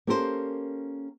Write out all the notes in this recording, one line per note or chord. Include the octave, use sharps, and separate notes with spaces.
A#3 C#4 G4 A4 A#4 C5